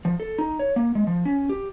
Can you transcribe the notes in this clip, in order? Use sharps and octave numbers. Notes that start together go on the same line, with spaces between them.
F3
A4
D#4
C#5
A#3
G#3
F3
C#4
G4